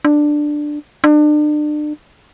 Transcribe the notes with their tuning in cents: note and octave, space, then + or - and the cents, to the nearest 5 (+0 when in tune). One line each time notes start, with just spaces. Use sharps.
D4 +10
D4 +35